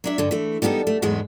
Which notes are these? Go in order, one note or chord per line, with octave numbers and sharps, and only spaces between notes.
F#3 D4 E5
G2 D3
E3 A3
G3 B3 D#4 G#4 A4
A3
E2 G#2 F#3 G#3 B3